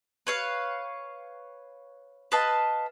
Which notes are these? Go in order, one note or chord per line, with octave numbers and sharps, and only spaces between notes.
B4 C#5 F5
B4 D#5 F5 A5